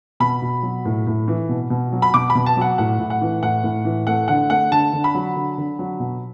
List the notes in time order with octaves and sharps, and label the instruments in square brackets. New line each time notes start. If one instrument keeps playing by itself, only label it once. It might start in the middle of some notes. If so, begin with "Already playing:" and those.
[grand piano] B2 B5
B2
F#3
A2
A2
E3
B2
B2
F#3
B5
B2 D6
B5
B2
A5
F#3 F#5
A2 F#5
A2
F#5
E3
A2 F#5
A2
E3
A3 F#5
D3 F#5
A3 F#5
D3 A5
D3
B5
F#3
D3
D3
F#3
B2